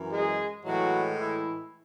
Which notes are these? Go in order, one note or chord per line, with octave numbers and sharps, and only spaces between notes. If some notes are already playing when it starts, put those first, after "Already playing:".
Already playing: F#2 E3
G#3 G#4
A2 E3 F#3 G#3 F#4
E3 E4